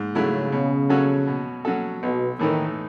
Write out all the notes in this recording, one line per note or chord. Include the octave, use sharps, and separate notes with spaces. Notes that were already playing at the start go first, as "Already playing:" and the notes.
Already playing: G#2
C#3 F#3 A3 E4
B2
F#3 C#4 F#4 A4
B2
F#3 C#4 F#4 A4
B1 B2
A2 D#3 E3 A3 D#4